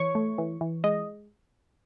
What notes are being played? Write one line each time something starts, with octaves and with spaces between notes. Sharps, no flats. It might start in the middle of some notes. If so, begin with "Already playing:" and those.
Already playing: E3 C#5 C#6
A3
E3
E3
G#3 D#5